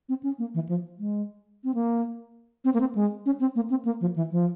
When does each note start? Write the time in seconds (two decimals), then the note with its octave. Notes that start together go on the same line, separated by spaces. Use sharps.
0.09 C4
0.23 C#4
0.39 A#3
0.54 E3
0.69 F3
0.99 G#3
1.64 C4
1.74 A#3
2.65 C4
2.74 A#3
2.81 C4
2.95 G#3
3.26 C#4
3.40 C4
3.56 A#3
3.70 C4
3.85 A#3
4.01 F3
4.16 E3
4.31 F3